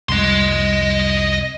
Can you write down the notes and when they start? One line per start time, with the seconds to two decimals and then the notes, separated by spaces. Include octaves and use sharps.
0.09 C2 F2 D#5 C6